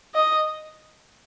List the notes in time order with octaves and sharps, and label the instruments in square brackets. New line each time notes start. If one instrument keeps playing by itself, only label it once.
[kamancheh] D#5